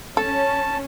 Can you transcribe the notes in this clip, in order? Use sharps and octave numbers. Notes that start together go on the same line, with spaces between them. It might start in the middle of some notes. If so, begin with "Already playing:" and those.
C#4 A4 A5